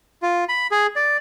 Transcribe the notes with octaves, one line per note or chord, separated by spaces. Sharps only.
F4
B5
G#4
D5